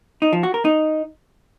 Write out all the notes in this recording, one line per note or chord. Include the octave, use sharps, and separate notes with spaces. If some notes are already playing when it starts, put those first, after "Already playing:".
D#4
F3
F#4
A#4
D#4